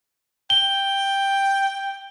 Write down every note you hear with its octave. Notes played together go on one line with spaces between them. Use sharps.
G5 G7